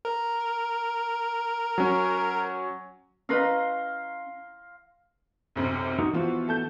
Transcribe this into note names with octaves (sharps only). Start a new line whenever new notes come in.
A#4
F#3 C#4
C#4 B4 D#5 F5 A#5 C6
B1 F#2 C3
D#4 F#4 A#4
E3 F3 B3 F4 F#4
A3 A5 G6